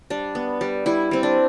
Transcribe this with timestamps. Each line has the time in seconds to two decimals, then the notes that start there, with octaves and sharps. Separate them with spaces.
0.10 G3 D4
0.35 B3
0.61 G3
0.86 G3 E4
1.11 G3 C4
1.23 D4